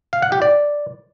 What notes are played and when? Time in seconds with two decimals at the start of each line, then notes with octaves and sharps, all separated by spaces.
0.13 F5
0.22 F#5
0.32 G4
0.42 D5